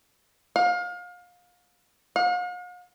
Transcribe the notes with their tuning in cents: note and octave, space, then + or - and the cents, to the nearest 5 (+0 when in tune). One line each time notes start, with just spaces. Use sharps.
F5 +30
F5 +45